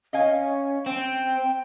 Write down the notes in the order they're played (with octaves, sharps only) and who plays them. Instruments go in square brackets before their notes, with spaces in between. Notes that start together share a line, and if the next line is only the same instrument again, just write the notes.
[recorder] C#4 [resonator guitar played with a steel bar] D#5 F5 G#5
[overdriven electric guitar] C4 [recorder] G5